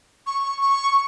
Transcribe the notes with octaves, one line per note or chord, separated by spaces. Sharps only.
C#6
C#6